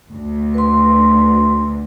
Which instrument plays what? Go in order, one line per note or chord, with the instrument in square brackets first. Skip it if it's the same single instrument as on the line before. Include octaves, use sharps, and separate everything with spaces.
[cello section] D2
[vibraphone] B4 C6